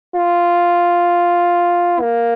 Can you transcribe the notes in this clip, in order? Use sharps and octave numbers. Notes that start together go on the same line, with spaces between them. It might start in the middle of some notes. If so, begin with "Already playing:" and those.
F4
A#3